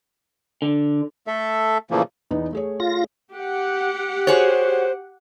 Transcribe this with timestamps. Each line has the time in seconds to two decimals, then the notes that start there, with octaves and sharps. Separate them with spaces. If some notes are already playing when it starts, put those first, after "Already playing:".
0.62 D3
1.27 A3 A4 E5
1.91 A#2 C#3 E3 F3 A3 A#3
2.31 E2 B3 D#4
2.52 A3 G#4 C#5
2.80 F4 A#6
3.32 G4 F#5
4.27 F#4 G#4 C5 C#5